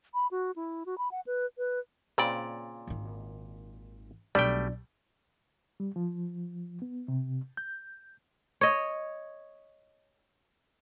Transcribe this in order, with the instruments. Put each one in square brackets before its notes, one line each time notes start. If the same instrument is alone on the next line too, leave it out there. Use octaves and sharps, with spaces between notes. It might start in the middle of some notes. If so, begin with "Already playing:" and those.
[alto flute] B5
F#4
E4
F#4
B5
F#5
B4
B4
[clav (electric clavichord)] A#2 D5 [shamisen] C#3 C4 B5
[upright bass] G#1 D#3
[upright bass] B1 B3 [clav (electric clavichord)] G3 A3 G5 [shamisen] D4
[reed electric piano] G3
F3
B3
C3
G6
[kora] C#5 D#5